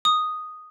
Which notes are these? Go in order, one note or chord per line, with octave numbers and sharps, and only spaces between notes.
D#6